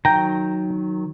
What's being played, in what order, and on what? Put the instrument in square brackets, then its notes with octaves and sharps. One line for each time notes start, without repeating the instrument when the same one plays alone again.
[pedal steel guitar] D#3 F#3 [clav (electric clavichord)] G5 A#5